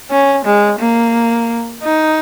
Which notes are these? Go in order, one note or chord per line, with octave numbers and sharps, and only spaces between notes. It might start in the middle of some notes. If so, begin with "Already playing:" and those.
C#4
G#3
A#3
D#4